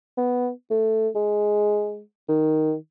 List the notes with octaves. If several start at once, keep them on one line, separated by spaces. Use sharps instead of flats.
B3
A3
G#3
D#3